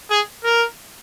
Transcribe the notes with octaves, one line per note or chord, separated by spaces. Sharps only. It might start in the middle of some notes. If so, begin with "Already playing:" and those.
G#4
A#4